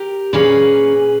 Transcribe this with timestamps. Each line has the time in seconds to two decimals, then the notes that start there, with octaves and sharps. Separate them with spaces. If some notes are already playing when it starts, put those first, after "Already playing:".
Already playing: G4 A#4
0.33 A#2 A#3 C#4 G#4 B4